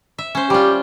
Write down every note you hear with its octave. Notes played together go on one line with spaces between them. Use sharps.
E5
C#4 C5
G3 F4 G4